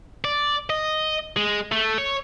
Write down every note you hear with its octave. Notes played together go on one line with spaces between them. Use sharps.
D5
D#5
G#3
A3
C#5